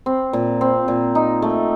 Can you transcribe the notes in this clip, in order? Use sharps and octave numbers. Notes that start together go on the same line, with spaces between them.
C4
A#2
C4
A#2
D#4
A3